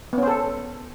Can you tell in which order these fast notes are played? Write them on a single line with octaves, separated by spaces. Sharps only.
B3 C#4 C5 A4